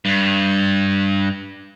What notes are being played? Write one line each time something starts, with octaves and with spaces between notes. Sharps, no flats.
G2